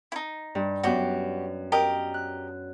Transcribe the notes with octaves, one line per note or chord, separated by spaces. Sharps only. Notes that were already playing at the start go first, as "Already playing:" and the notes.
D#4 E4
G2
F#2 B3 F#4 G4
G4 A#4 D#5
F#6